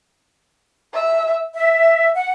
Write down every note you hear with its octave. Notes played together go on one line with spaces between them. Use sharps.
E5
E5
F#5